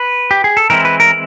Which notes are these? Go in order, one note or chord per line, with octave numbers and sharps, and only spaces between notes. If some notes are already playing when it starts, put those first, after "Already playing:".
Already playing: B4
G4
G#4
A4
E3 G#3 C4 E4 A#4
B4
A#4